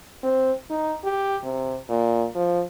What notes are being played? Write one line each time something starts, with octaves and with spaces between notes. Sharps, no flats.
C4
D#4
G4
C3
A#2
F3